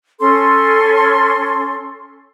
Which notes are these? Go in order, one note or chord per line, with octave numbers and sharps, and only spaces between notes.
C#4 A4 C6